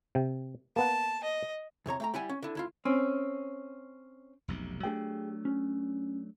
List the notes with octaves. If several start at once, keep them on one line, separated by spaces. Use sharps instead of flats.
C3 G5
A#3 B3 F#5 A5
D#5
E2 C3 C#5 A#5
A3 G5 A#5
G3 E4 F#5 G#5
C#4
D3 E4
D2 E4 F4
C4 C#4
F1 B1 C3
F#3 A3 D4 G4 G#4 G5
C#4